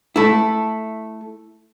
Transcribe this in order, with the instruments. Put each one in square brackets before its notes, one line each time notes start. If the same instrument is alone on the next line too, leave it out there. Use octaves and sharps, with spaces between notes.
[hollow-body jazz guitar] A3 E4